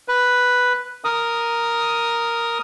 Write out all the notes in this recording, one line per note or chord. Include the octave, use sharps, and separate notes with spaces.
B4
A#4 D#6